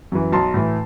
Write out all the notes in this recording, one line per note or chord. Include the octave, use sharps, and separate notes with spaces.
F#2 E3
B1 A5 C6
A2 E3